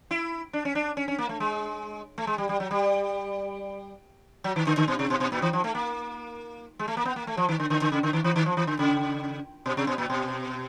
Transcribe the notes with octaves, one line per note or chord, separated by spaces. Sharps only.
E4
D4
C#4
D4
C#4
C#4
A#3
A3
G#3
A3
G#3
G3
G3
F#3
G3
F#3
D#3
D3
D3
B2
C3
B2
B2
A#2
E3
F3
A3
A#3
G#3
A3
A#3
B3
A#3
A3
F3
D#3
D3
D3
D3
C#3
D3
D#3
E3
D#3
F3
E3
D3
C#3
B2
C3
B2
A#2
B2